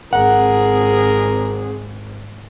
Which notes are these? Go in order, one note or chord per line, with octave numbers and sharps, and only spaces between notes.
G#1 C4 G#4 A#4 F#5